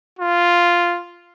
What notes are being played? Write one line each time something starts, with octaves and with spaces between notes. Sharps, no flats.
F4